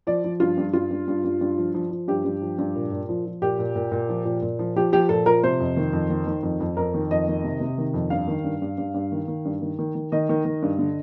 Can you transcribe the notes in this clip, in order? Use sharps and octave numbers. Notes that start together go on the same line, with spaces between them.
F3 D5
F3
G2 F4
G2
G2 F4
G2
G2
G2
G2
F3
F3
F3
G2 G4
G2
F3
G2
A#2
A#2
F3
F3
A#2 G4
A#2
A#2
A#2
F3
A#2
A#2
F3
F3 G4
F3 G4
A#2 A4
F3 A#4
C3 C5
F2
D#3
F2
D#3
D#3
F2
F2
F2 A#4
D#3
F2 D#5
D#3
C3
C3
D#3
F2
G2 F5
D#3
G2
G2
G2
G2
D#3
D#3
G2
D#3
D#3
D#3
D#3 D#5
D#3
D#3
G2
D3